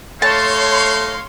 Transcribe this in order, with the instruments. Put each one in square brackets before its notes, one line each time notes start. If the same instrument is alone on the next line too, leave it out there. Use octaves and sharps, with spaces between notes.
[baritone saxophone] A3 [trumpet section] D#4 F5 [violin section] C#5 C6 [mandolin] A5